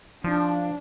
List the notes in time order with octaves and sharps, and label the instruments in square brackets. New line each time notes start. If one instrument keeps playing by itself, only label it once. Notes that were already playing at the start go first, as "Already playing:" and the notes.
[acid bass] F3 [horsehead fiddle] D4